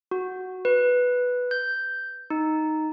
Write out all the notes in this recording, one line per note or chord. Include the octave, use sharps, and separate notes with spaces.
F#4
B4
G6
D#4